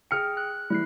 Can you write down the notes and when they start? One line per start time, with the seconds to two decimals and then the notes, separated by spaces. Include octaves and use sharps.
0.11 G#4 G5 F6 C#7
0.37 F#6
0.70 E3 G3 E4 F#6 C7